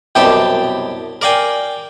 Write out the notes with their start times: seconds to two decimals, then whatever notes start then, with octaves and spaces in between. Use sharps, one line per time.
0.15 C2 F#2 B2 G4 G5 A5
1.21 A#4 D5 F5 G5 G#5